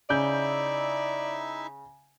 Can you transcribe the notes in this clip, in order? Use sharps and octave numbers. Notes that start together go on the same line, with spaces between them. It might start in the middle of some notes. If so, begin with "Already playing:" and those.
C#3 D#4 E4 D5 E5 G6